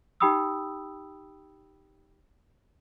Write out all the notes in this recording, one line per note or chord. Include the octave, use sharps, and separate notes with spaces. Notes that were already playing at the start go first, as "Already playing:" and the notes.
D#4 G4 G5 B5 D#6 E6